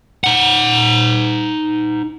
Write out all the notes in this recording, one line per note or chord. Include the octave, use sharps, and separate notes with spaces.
D#4 F#5